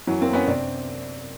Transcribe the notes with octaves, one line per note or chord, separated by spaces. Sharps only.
F#2 E3 F#3
A#3 C4
F#2
B3 C#4
C3 C4 D4